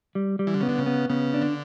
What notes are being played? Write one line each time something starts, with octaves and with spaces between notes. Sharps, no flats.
G3
G3
E3
D3
C#3 B3
D3
C#3
B3
C#3 B3
D4
D3